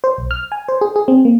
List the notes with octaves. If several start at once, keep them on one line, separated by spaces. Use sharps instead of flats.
C5
B1
F6
G#5
C5
G#4
G#4
C4
A#3